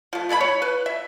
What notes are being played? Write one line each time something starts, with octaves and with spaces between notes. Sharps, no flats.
F3 A3
E3 A3 D#4 B5
C#5
B4
E5